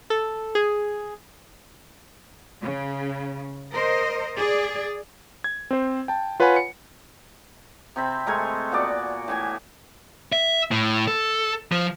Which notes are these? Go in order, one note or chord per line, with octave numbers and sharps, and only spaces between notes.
A4
G#4
C#3
A#4 C5 D#5
G#4 D5
G#6
C4 C5
G5 A5
F4 B4 C#5 F#5 G#5 B5
C#7
C3 C4 B5
G#3 A3 A#4 G#5
A#2 B3 F#4 D5
A2 E3 G#5
E5
A2
A4
F3